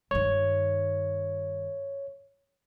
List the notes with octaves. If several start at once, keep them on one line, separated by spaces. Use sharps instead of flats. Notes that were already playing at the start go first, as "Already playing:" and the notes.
G2 D#3 C#5